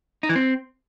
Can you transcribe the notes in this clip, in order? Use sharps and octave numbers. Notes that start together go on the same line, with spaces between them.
D#4
E3
C4